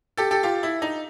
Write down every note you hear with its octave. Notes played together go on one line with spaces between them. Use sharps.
G4 A4
G4 A4
F4 G4
E4
D#4